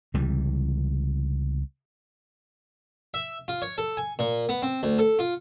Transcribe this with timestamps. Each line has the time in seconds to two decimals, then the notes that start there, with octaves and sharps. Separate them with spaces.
0.14 C#2 C3 E3 G3
3.14 E5
3.48 F4
3.62 C#5
3.78 A4
3.97 G#5
4.19 A#2
4.49 B3
4.62 C4
4.83 D2
4.99 A4
5.19 F4